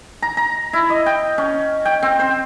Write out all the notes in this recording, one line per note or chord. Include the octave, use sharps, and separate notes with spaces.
A#5
A#5
E4
D#5
G5
C#4
G5
C4
C5